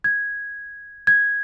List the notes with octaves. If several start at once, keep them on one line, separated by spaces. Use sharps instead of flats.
G#6
G#6